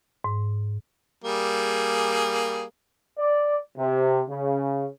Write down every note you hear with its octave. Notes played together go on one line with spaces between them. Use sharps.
G#2
G3 A#3 G#4
D5
C3
C#3